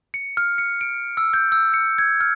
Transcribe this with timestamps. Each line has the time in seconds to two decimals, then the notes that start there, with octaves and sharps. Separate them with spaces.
0.14 C#7
0.37 F6
0.58 C#7
0.81 D7
1.17 E6
1.34 G6
1.52 E6
1.74 C#7
1.98 G#6
2.21 F6